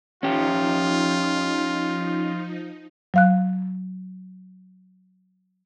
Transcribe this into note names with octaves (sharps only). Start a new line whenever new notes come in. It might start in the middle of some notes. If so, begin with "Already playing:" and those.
F3 C#4 D#4 F4 G4
F#3 F5 F#6